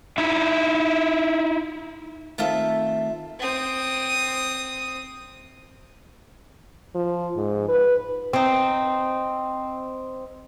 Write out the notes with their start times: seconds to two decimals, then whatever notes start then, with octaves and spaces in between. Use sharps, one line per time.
0.18 D#4 E4 E5
2.38 D#3 A3 C4 F4 E5
3.40 C4 D#6
6.95 F3
7.36 G#2
7.69 B4
8.33 C4 D#4